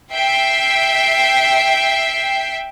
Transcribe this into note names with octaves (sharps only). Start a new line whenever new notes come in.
E5 G5 C7